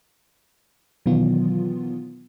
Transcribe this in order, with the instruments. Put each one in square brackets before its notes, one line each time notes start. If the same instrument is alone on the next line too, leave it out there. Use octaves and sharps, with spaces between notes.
[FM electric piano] B2 D#3 E3 F#3 B3 F4